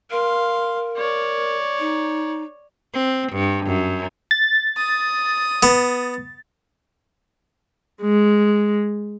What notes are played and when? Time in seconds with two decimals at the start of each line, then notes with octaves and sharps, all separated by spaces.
0.11 A#4 F5 C6
0.97 C#5 D5
1.79 D#4
2.94 C4
3.33 G2
3.67 F#2
4.31 A6
4.77 D#6
5.63 B3
8.02 G#3